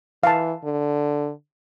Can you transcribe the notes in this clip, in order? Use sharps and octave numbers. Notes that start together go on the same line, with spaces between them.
E3 F5 A5
D3